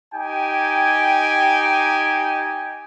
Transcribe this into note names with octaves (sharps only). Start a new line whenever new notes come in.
D#4 G4 G5 G#5